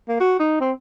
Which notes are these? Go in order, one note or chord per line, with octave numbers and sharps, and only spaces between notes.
A#3
F#4
D#4
C4